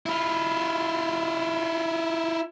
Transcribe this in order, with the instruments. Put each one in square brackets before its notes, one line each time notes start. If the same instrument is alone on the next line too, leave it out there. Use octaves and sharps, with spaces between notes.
[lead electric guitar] E4 F4